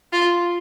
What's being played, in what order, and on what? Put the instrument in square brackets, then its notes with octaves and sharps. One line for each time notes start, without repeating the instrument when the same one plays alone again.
[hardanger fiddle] F4